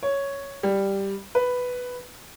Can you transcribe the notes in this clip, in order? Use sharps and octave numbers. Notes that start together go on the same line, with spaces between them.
C#5
G3
B4